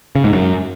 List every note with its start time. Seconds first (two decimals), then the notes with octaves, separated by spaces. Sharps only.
0.15 C#3
0.24 G#2
0.33 F#2